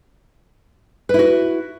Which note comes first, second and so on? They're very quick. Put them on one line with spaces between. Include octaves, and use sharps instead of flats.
B4 E4 F#4